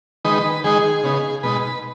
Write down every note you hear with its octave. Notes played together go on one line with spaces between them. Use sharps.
D#3 G#3 D#4 B4
D#3 G#3 D#4 G#4
C#3 B3 D#4
B2 G#3 D#4 B4